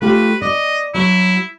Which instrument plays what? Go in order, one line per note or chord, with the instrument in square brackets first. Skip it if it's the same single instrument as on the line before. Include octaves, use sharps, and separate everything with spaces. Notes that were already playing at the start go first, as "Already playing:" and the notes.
[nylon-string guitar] A3 F4 G4 [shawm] B4
[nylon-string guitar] D5 [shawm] D#5
[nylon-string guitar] F#3 C#5 [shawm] E4